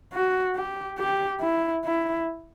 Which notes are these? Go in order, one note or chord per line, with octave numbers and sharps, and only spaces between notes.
F#4
G4
G4
E4
E4